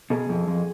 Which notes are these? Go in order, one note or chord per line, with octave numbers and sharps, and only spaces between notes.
B2 G#4
F2
F2